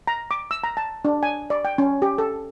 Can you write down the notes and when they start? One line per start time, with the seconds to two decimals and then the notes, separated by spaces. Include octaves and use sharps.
0.07 A#5
0.31 D6
0.51 E6
0.64 A#5
0.77 A5
1.05 D4
1.23 G#5
1.50 D5
1.65 G5
1.78 C#4
2.02 G4
2.18 A4